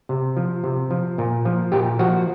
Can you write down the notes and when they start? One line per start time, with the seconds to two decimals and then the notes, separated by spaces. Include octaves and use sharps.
0.09 C3
0.37 F3
0.64 C3
0.91 F3
1.18 A#2
1.45 F3
1.72 A#2 G4
1.99 F3 F#4